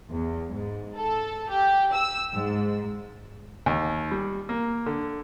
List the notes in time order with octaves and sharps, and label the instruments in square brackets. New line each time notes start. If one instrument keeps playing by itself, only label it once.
[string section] E2
G#2
A4
G4
E6
G#2
[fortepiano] D#2
G3
A#3
D3